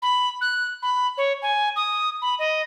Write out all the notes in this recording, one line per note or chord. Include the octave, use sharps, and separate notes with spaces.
B5
F#6
B5
C#5
G#5
D#6
B5
D#5